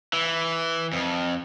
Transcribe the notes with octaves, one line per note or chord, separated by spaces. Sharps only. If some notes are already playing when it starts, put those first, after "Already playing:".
E3
F2